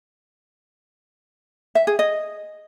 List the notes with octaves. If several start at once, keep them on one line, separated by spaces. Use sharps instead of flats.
E5
G#4
D#5